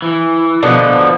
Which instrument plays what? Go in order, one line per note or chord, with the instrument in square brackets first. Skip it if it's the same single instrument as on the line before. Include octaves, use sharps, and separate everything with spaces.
[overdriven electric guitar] E3
[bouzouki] B2 D3 [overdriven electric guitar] F3 D4